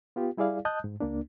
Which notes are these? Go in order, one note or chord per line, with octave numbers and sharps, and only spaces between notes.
B3 F4 G4
G3 E4 G#4 D5 F5
D#5 A5 D#6 F#6 G6
G#2
C#2 A#3 D4